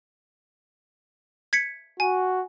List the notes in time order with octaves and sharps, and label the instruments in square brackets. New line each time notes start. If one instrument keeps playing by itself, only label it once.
[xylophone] G#6 B6 C#7
[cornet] F#4 [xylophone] G#5